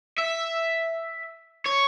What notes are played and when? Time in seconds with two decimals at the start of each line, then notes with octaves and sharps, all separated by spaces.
0.19 E5
1.66 C#5